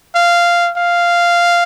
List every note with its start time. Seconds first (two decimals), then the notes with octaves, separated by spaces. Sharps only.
0.15 F5
0.77 F5